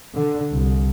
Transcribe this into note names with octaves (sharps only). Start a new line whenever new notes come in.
D3
C2